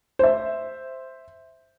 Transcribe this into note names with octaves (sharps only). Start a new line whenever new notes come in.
C5 E5